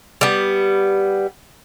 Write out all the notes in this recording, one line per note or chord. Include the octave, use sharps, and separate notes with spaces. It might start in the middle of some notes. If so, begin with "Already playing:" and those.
G3 B3